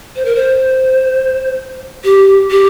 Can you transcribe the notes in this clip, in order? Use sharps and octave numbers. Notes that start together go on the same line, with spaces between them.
C5
A#4
C5
G4
G4